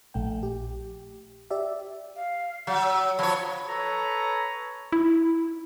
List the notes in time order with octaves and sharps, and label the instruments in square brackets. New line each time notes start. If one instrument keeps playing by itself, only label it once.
[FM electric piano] A#1 A3 G5
G4
G4 D5 E5
[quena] F5
[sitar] F#3 [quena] F#5
[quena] E6
[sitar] F3 C#5 [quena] B5
[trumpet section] A4 B4 C#5 A#5
[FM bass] E4